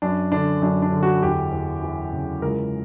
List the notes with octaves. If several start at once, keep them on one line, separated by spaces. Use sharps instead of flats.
F#2 D4
D3 D4
F#2 D4
D4
D3
F#4
E2 G4
E2
E3
C#3
C#2 A#4